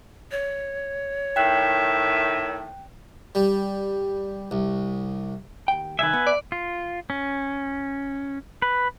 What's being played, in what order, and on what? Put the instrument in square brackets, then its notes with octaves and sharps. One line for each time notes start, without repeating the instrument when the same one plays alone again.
[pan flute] C#5
[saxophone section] A2 D#3 E5 [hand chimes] G5 F#6
[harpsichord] G3
C2
[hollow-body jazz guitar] D#2 G5
[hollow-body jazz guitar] C2 D#3 [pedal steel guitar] B4 E5 [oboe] G#5
[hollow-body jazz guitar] B3
[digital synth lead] D5
[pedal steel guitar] F4
C#4
B4